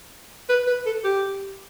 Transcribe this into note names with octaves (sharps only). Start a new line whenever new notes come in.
B4
B4
A4
G4